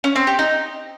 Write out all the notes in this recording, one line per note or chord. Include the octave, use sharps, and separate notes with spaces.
C#4
C4
G4
D#4